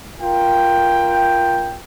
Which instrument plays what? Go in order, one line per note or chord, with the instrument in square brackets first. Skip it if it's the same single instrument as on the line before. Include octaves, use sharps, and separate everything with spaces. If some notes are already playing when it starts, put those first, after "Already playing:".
[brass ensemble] F4 A#4 G5